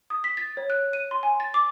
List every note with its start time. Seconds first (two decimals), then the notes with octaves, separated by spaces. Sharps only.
0.10 D#6
0.24 B6
0.37 A6
0.57 C#5
0.70 F#6
0.93 D#7
1.11 C6
1.23 G#5
1.40 A6
1.54 D6